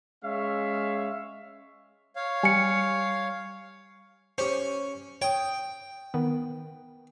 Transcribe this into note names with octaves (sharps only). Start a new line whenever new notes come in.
G#3 C#4 C#5 E5 F5
C#5 F5
G3 G#5 C#7
C#4 G4 C5
C#5 G5 D#6
D#3 B3